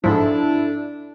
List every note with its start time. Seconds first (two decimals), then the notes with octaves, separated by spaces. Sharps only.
0.04 G#2 F3 D4 E4 A4